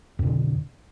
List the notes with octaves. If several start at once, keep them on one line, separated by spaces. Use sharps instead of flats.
F2 B2 D3